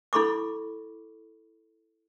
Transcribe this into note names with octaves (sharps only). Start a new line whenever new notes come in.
E4 A4 B5 C#6 D6